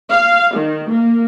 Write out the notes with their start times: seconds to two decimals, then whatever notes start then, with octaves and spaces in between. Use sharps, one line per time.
0.10 F5
0.55 D#3
0.90 A#3